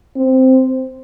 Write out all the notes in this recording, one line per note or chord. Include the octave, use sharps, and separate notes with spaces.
C4